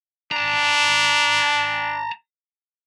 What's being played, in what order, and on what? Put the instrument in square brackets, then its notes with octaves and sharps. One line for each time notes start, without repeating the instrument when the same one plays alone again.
[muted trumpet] D4 [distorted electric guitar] A5 A#5